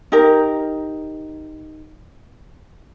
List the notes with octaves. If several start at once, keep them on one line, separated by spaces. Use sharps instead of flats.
D#4 G4 A#4